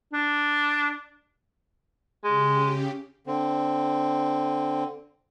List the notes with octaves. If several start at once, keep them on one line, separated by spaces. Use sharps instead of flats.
D4
C#3 G#3 G4
D3 C4